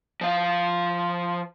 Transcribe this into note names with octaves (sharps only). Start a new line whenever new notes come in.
F3 F5